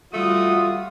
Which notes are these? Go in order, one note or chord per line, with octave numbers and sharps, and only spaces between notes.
G3 A3 F4 F#4 D#6